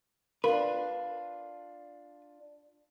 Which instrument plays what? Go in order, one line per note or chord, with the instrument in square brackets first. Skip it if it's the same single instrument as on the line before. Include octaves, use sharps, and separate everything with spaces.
[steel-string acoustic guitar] D4 F4 [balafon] A#4 [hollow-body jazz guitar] B4